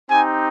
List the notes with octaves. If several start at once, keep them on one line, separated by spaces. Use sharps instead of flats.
C4 D#4 G4 G#5